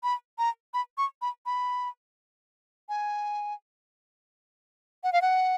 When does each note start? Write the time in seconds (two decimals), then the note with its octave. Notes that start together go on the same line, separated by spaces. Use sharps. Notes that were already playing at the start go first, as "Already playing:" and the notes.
0.03 B5
0.38 A#5
0.74 B5
0.98 C#6
1.22 B5
1.46 B5
2.89 G#5
5.04 F#5
5.13 F5
5.22 F#5